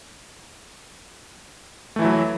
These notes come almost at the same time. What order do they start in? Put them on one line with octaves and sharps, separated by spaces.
A3 E3 E4 F#3